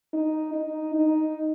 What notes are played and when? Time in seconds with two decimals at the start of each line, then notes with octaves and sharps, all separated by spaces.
0.13 D#4
0.54 D#4
0.94 D#4